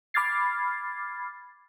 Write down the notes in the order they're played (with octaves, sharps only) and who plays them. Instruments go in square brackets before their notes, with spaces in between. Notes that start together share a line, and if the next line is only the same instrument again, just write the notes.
[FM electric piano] B5 D6 F6 G#6 A6 C7